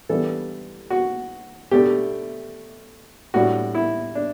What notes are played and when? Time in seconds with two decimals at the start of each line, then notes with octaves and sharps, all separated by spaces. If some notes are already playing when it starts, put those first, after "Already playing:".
0.09 E3 G3 B3 D4 A4
0.90 F#4
1.71 B2 A3 D4 G4
3.34 A2 G3 D4 F#4
3.75 E4
4.15 D4